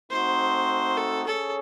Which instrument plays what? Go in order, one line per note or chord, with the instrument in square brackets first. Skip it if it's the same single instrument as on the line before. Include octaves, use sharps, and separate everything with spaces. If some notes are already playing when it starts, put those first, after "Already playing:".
[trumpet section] A3 C4 D#4 F#4 [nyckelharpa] C5
[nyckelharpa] A4
[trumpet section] C#4 G#4 C#5 [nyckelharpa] A4